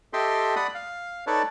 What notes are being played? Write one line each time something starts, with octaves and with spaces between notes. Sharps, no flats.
G4 A4 D#5 E5 G5 C6
D5 F#5 B5 D#6
F5
D#4 A4 B4 C#5 D5 A5